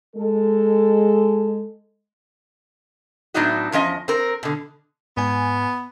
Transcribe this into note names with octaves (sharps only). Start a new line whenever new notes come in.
G#3 A4
A2 F#3 B3 D4 D#4 F#4
E2 F3 C#4 D#5
C4 A#4
B2 D3
G#2 B3 G#5